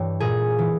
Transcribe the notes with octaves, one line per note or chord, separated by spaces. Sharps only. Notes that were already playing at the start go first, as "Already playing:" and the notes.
Already playing: G2 E3 G4 C#5
A#2 G#4
E3